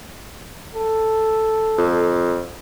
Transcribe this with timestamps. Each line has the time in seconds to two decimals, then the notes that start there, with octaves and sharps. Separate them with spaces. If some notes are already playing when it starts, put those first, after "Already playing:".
0.75 A4
1.78 F2